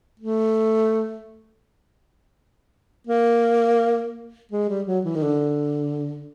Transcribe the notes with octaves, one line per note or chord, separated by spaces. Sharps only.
A3
A#3
G#3
G3
F#3
E3
D#3
D3